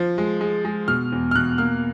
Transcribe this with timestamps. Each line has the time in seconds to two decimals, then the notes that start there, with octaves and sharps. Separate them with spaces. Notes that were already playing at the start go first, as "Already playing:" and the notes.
Already playing: F3
0.18 G#3
0.41 G#3
0.65 G#3
0.88 B2 F6
1.12 E2
1.31 F6
1.35 B2 F#6
1.58 A#3 F6